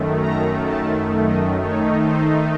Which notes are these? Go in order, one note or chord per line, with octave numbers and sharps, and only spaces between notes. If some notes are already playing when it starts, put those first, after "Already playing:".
Already playing: F#2 D#3 A3
A#5
A5
D#5
D#3 A3 D#4 C#5
C5